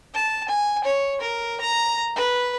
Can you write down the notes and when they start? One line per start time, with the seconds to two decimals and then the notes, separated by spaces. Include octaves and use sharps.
0.14 A5
0.49 G#5
0.84 C#5
1.21 A#4
1.61 A#5
2.16 B4